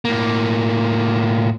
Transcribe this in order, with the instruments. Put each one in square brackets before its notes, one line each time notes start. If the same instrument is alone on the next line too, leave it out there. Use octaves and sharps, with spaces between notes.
[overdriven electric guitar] A2 A#3